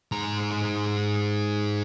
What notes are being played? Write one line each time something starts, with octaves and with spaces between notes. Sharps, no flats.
G#2 A#5